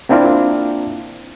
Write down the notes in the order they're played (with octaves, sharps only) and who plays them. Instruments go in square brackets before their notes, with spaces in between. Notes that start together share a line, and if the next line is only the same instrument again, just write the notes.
[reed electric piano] A#3 C4 D4 E4 F4 A#4